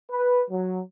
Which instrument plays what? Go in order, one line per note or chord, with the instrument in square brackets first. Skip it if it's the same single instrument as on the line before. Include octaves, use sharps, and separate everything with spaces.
[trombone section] B4
F#3